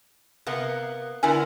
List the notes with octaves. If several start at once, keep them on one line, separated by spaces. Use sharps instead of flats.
C3 A#3 B3
D3 B3 E4 A#4 G#5